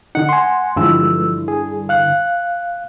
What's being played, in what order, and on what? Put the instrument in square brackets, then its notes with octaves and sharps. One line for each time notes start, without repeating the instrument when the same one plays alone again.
[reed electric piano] D3 D#4 [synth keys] F#5
[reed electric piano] G#5 C6
[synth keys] G2 D3 E3 [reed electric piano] F3 G#3 E6
[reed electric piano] G#4
F5 F#6